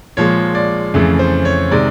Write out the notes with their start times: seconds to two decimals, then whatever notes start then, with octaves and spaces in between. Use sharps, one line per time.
0.17 A#2 F3 G#3 C#5
0.55 D5
0.94 F2 C#3 E3 A3
1.19 C5
1.45 C#5
1.71 C3 D#3 G#3 D5